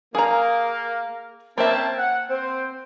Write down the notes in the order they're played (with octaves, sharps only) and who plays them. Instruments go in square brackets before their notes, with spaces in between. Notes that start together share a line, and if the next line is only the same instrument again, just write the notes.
[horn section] A#3 A#4 [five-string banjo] G#4 A#5
[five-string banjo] A#3 E5 [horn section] C4 C#4 A5
[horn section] F#5
C4 C5